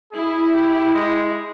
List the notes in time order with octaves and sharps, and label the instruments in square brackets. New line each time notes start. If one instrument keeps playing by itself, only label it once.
[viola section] E4 [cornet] G#4
[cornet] G4
G#3